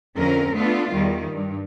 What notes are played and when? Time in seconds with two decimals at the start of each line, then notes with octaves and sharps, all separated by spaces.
0.17 F2 D3 C#4 A#4
0.56 A3 B3 D4 F4
0.93 E2 D#3 G3
1.31 G2